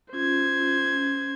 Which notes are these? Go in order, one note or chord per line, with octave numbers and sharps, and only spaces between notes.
C#4 F4 C5 G#6
C#4